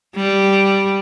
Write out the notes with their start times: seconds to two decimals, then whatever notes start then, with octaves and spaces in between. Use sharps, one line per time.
0.16 G3